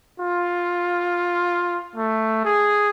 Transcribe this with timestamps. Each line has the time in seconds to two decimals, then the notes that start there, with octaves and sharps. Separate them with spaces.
0.20 F4
1.96 A3
2.45 G#4